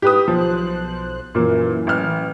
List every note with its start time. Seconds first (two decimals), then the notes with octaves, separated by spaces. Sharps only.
0.02 G#2 G4 B4 D#6
0.28 B1 F3 C5 F#6
1.35 F#2 A#2 E3 A#3
1.87 A1 F6